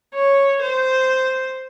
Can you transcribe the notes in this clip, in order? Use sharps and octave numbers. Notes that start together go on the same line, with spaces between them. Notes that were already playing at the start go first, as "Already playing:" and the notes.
C#5
C5